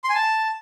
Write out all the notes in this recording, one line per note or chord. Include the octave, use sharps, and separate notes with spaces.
C6
G#5
A5